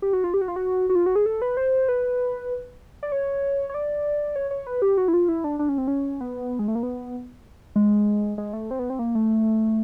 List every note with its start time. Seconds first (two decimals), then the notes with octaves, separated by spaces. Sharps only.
0.02 G4
0.13 F#4
0.24 F4
0.34 G4
0.41 F#4
0.48 F4
0.56 F#4
0.90 F#4
0.95 F4
1.06 F#4
1.16 G#4
1.26 A4
1.42 B4
1.57 C5
1.88 B4
3.03 D5
3.12 C#5
3.69 C#5
3.74 D5
4.36 C#5
4.51 C#5
4.67 B4
4.82 G4
4.97 F#4
5.08 E4
5.14 F4
5.28 E4
5.44 D4
5.59 D4
5.69 C#4
5.78 C4
5.88 C#4
6.21 B3
6.59 G#3
6.68 A3
6.75 A#3
6.83 B3
7.76 G#3
8.38 G#3
8.53 A3
8.71 C4
8.79 B3
8.90 C4
8.99 A#3
9.15 A3